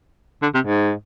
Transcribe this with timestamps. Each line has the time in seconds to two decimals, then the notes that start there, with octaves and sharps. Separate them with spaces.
0.42 D3
0.54 C3
0.67 G#2